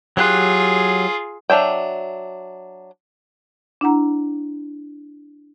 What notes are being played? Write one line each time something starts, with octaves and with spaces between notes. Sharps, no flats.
F#3 F4 G4 G#4 F#6
F#3 D4 E5 G5
D4 E4 F#5 A#5